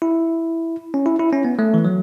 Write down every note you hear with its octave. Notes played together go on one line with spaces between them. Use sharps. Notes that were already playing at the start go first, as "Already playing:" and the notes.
E4
C#4
E4
E4
C#4
B3
A3
E3
F#3